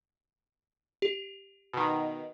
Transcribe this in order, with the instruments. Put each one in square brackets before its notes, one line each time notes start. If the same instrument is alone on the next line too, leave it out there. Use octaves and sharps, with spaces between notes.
[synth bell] G4
[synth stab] B2 D#3